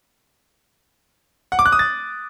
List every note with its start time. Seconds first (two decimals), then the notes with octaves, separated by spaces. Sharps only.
1.52 F#5
1.59 D6
1.66 F#6
1.72 D#6
1.79 A6